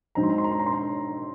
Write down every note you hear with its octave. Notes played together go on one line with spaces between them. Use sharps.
G#2 F#3 C4 D#4 A#5
C6
A#5
C6
A#5
C6
A#5
C6
A#5